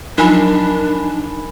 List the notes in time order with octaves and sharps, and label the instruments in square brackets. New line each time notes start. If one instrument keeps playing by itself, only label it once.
[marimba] F3 F#3 F4 [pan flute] D4 [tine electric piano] D#4 [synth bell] A#4 G#5 B5